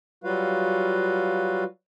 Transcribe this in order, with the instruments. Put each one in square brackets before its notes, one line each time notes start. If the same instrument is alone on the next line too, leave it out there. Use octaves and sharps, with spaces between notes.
[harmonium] F#3 G3 F4 F#4 B4 F5